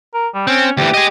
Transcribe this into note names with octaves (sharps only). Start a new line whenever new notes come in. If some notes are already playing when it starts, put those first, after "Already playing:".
A#4
G3
C4 C#4
D2 E3 G4
G#4 D#5